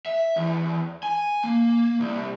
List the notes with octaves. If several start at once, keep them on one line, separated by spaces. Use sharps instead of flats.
E5
E2
G#5
A#3
C2